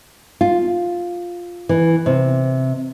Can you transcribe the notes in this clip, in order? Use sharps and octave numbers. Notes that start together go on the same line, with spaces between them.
F4
E3
C3